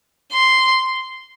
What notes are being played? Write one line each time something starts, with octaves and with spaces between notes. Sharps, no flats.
C6